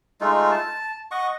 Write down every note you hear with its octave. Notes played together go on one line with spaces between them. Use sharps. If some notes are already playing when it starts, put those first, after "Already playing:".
G#3 A3 D#4 F4
A5
D#5 F#5 C#6